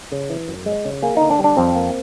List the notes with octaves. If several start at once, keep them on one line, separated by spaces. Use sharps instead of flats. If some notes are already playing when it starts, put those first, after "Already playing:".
C#3
E3
F#2
G#3
C#3
A#3 G#4
D3 D#4
D4
G3
D4
F2 C4
A#3